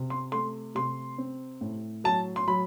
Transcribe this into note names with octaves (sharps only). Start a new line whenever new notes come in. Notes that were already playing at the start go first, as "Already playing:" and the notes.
Already playing: C3
C6
A3 C6
C3 C6
C4
A2
F#3 A5
C6
F#3 B5